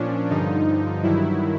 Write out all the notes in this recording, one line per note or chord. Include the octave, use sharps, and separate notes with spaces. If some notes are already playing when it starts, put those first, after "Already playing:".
Already playing: A#2 F3 C#4 D4
G2 D3 F3 D#4
G2 D#3 F#3 E4